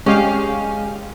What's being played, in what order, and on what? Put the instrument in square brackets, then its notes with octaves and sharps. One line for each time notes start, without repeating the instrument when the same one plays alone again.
[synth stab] G#3 G4 F5 [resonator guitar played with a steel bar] C#4